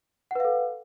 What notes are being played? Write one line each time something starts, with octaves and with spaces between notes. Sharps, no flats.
A4 B4 F5 F#5